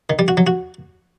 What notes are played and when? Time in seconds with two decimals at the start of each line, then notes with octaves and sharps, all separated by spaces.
0.10 D#3
0.19 G3
0.28 F#4
0.37 F#3
0.47 F#4